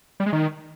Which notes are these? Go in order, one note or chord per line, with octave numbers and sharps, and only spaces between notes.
G3
G#3
D#3